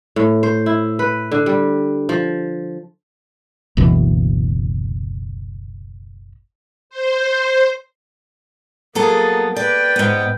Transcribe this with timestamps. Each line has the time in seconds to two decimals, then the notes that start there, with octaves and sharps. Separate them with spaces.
0.16 A2
0.43 C5
0.66 E4
0.99 B4
1.32 D3
1.46 G3
2.09 F3
3.77 F#1 D2 B2 E3
6.90 C5
8.95 F#3 A#3 B3 G#4 A4
9.56 B4 D5 G5
9.96 G#2 B3